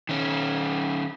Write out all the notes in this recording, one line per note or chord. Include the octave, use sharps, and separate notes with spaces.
D#3 C#4